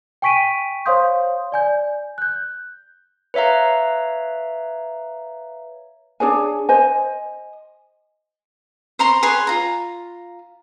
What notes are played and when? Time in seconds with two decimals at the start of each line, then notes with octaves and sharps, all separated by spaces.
0.22 G5 G#5 C#6 B6 D7 D#7
0.86 C5 C#5 F5 C6 D#6 G6
1.52 D5 G#5 G6
2.18 F#6 G6
3.34 B4 C#5 E5 F5 A#5
6.20 D4 G#4 C#5 G#5
6.69 C5 D#5 G#5
8.99 C5 A#5 C6 C#6
9.23 G#4 B4 C#5 C6
9.47 F4 A#5